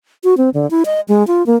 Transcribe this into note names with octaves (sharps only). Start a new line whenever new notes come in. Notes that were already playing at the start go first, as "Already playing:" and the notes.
F#4
C4
D3
E4
D#5
G#3
F4
A#3